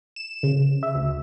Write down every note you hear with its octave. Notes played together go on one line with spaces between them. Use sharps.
E7
C#3
E5
D2